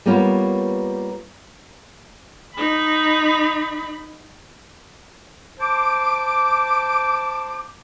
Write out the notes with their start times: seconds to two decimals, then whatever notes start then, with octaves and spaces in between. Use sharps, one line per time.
0.06 G3 A#3 B3 F4 C#5
2.55 D#4 B5
5.59 C5 A5 D6